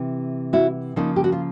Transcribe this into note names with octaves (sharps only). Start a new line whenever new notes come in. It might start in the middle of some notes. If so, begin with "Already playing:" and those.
Already playing: C3 E3
E4 F#4
C#3 F3 A#3 D#4 F4
G4
F#4
F4